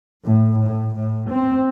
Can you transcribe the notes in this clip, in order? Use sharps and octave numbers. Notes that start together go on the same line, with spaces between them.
A2
A2
A2
C4